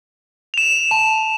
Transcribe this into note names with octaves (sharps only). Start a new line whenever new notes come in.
E7 F7
A5